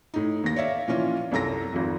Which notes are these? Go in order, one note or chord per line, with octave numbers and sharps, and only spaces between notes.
A2 D#4
D#2 A#6
C#5 D5 E5 F5
A#2 E3 F3 C#4 E4 F4
C2 F#2 A4 A#5 A#6
G#1 F2